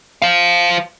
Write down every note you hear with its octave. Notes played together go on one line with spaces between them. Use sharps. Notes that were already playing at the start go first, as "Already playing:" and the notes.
C5 F5